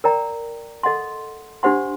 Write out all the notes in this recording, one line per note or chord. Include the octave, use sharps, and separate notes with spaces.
A#4 D5 G5 A#5
A4 D#5 F#5 C6
D4 G4 C5 F#5 C6